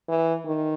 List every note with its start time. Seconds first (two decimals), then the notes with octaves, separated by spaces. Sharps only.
0.09 E3
0.46 D#3